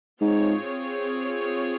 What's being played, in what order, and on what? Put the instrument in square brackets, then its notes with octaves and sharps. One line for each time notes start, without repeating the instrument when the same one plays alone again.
[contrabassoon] G#2 [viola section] C4 F4 G#4 C#5